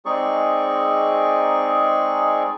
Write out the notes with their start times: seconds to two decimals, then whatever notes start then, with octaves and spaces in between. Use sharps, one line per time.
0.06 G#3 C4 D#4 G#4 D5 C#6